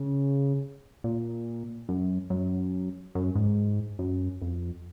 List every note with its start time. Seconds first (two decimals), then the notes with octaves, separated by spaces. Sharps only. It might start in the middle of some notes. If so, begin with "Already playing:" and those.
Already playing: C#3
1.04 A#2
1.89 F#2
2.30 F#2
3.15 F#2
3.36 G#2
3.99 F#2
4.42 F2